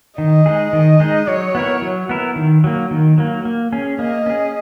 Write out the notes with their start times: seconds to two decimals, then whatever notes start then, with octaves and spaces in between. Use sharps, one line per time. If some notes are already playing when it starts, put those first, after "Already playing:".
0.18 D#3 D#5
0.46 G#3 D#4 G#4
0.73 D#3
1.00 G#3 D#4 G#4
1.27 F#3 C#5
1.55 B3 E4 A#4
1.82 F#3
2.09 B3 E4 A#4
2.36 D#3
2.64 F#3 A#3
2.91 D#3
3.18 F#3 A#3
3.45 A#3
3.73 C#4 G#4
3.99 A#3 D#5
4.26 C#4 G#4